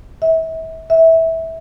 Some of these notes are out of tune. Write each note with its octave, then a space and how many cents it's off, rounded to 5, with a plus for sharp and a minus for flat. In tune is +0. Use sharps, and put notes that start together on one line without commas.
E5 -30
E5 -15